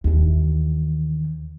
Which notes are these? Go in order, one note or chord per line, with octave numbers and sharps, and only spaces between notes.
D#2 E3